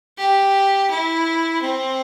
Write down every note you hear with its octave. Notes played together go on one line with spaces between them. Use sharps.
G4
E4
C4